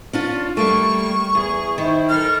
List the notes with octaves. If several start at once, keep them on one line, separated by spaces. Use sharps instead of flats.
C#4 D4 F4
G3 A3 A#3 C#6
E2 G#4
D#3 E4 C5
A4 A#4 F6